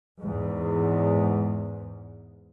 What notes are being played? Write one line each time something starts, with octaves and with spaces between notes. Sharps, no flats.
E2 G#2